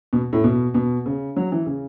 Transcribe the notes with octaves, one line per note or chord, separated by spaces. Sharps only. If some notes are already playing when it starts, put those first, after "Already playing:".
B2
A2
B2
B2
C#3
F#3
E3
C#3